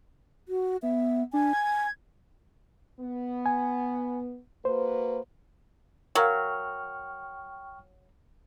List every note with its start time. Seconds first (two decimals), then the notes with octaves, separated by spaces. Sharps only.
0.48 F#4
0.82 B3 E5
1.33 D4 G#5
1.53 G#6
3.00 B3
3.46 G#5
4.65 A#3 F#4 B4 C5
6.15 F#3 A#4 F5 G5 C#6 F6